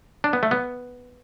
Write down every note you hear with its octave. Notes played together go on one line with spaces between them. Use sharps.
D4
B3
A3
B3